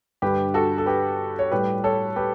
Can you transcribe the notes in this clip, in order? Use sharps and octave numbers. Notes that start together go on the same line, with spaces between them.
G2 D3 G3 G4 B4
F#4 A4
A4
G4 B4
C#5
A2 G3 G4 B4
A4 C#5
G4 B4